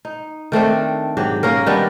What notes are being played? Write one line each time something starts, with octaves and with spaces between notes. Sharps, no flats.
D#4
D#3 A3 C4 D4
G#2 F#3 G4
A#3 C#4 A#4
D#3 G3 B3 D4